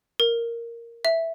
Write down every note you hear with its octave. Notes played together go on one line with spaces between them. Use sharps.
A#4
E5